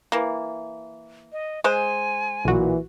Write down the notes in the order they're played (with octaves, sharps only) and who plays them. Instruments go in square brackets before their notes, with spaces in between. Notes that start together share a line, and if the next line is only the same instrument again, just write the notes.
[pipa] E3 A#3
[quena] D#5
[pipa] G#3 C5 [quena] G#5
[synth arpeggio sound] B1 F#4 [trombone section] A#2 E3